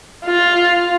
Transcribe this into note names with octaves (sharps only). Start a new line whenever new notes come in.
F4